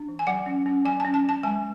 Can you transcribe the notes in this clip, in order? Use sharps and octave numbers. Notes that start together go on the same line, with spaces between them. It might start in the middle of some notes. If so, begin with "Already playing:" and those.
Already playing: D4
E3
G#5
F#3 F#5
C#4
C#4
F#3 G#5
C#4 A5
A5
F#3 A5
G#3 G#5